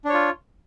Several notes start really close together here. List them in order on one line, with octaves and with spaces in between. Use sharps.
D4 C#5 F4